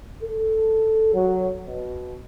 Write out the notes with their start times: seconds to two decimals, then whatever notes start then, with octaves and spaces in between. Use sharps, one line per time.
0.22 A4
1.14 F#3
1.67 B2